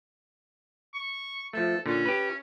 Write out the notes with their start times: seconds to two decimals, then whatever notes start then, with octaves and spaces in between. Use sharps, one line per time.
0.93 C#6
1.53 F3 A3 A4
1.86 A#2 D3 C#4
2.05 G4 B4